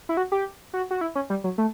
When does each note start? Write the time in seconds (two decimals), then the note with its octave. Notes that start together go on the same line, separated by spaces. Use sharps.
0.09 E4
0.17 F#4
0.32 G4
0.74 F#4
0.91 F#4
1.01 E4
1.15 C#4
1.30 G3
1.44 F#3
1.58 A3